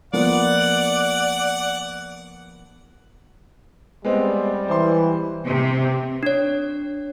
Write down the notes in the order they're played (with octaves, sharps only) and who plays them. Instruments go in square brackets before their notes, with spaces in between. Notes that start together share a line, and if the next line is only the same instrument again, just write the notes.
[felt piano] F3 A#3 B3 [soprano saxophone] D5 [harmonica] F#5
[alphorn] G3 [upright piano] G#3 B3 C4
[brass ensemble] E3 [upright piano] C5 C6
[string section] C3
[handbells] D4 C#5